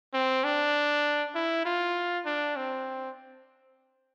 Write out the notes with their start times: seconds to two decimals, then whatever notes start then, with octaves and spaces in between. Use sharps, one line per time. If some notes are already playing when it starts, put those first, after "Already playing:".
0.14 C4
0.44 D4
1.35 E4
1.65 F4
2.26 D4
2.56 C4